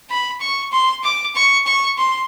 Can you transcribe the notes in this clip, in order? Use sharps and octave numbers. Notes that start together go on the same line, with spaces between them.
B5
C#6
C6
D6
C#6
C#6
C6